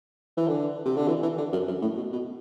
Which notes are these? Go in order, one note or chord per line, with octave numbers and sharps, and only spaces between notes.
E3
D3
C3
D3
E3
E3
D3
F#2
F#2
A2
B2
B2